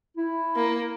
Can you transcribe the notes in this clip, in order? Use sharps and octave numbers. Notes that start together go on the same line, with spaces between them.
E4
A#3